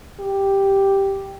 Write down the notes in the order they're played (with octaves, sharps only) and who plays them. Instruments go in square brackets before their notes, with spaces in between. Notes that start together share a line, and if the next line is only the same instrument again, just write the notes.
[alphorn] G4